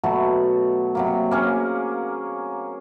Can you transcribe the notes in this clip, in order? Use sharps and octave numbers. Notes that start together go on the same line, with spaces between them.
B2 F#3 A3 F#4
C3 F#3 A#3
A#3 C#4 G#4